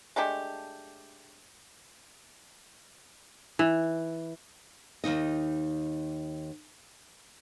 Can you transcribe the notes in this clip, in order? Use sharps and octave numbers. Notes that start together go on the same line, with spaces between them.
G#3 A3 D4 G4
E3
D#2 A#2 D#4 D#5